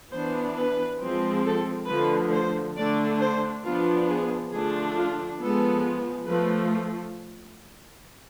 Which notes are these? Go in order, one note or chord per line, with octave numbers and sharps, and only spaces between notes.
E3 B3 D4 C5
B4
F3 G#3 C4
A4
D3 F3 A3 B4
C5
D3 A3 D4 D5
C5
F3 B3 D4 F4
G#4
D3 F3 A3 D4 G#4
F4
F3 G#3 B3 A4
F3 A3 B4